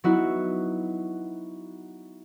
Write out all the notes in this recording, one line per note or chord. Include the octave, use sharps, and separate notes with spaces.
F#3 B3 D#4 E4 F#4